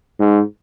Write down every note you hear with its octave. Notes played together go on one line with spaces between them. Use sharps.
G#2